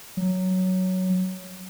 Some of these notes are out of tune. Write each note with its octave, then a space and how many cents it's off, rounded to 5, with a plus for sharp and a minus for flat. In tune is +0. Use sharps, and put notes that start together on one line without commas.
F#3 +5